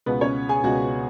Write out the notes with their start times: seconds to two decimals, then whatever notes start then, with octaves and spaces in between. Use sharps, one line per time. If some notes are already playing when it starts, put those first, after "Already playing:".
0.06 C#2 B2 G#3 B3 B4
0.21 C#4 C#5
0.49 G#4 G#5
0.63 C#2 B2 G#3 F#4 F#5